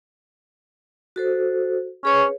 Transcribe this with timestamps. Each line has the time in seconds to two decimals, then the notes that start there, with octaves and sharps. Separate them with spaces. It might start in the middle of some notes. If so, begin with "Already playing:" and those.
1.16 F#4 A4 C5
2.05 C#4 G#4 B4 C#5